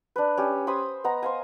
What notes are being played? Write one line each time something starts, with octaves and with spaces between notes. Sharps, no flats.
D4 B4
C#4 G4
C5 G#5 B5 D#6
B3 D#5 A#5
C5 F5 G#5